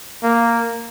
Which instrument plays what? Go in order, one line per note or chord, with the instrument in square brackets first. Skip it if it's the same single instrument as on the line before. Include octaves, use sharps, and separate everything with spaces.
[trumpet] A#3